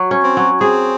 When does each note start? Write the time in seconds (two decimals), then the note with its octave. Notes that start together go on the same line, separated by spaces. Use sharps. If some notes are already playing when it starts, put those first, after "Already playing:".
Already playing: F#3
0.11 C#4
0.24 C4
0.37 F#3
0.61 C4 G#4